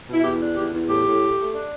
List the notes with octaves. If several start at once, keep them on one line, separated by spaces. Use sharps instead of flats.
B2 E4
E2 G4
D4
E2 G4
E2
A2 G4
A2
A3
A3
D4